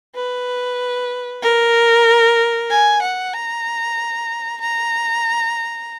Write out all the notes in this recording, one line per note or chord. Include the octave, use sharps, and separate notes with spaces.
B4
A#4
G#5
F#5
A#5
A#5